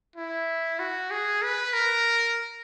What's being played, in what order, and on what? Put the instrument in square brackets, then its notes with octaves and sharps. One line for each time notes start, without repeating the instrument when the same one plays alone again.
[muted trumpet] E4
F#4
G#4
B4
A#4